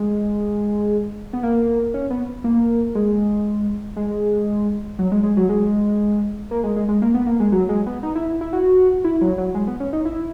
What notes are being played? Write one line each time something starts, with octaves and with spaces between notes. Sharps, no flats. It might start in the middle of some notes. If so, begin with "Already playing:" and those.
Already playing: G#3
B3
A#3
C#4
B3
A#3
G#3
G#3
F#3
G#3
G#3
F#3
G#3
A#3
G#3
G#3
G#3
A#3
B3
A#3
G#3
F#3
G#3
B3
D#4
E4
E4
F#4
E4
F#3
F#3
G#3
B3
C#4
D#4
E4